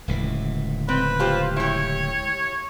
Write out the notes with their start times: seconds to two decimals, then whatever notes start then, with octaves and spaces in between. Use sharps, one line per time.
0.08 D1 C#2 E3
0.89 C4 B4
1.19 F4 G4 C5
1.56 E4 G4 C#5